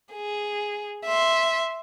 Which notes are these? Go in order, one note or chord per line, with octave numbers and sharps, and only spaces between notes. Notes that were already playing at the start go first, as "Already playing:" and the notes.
G#4
E5 C6